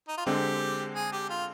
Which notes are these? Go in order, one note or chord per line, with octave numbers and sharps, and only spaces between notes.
D#4
F4
D3 G#3 C4 G4
G#4
G4
F4